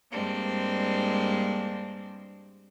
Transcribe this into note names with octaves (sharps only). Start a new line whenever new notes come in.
G2 G#3 A#3 C4 D4